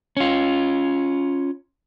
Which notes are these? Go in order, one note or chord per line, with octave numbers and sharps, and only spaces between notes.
C#4 F4